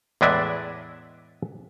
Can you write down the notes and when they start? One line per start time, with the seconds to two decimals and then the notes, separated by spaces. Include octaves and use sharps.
0.21 E2 A2 G#3 B4 D5 E5